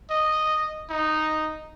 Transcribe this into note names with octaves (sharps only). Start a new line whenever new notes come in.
D#5
D#4